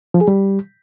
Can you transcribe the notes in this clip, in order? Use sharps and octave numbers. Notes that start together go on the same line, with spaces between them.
F3
G#4
G3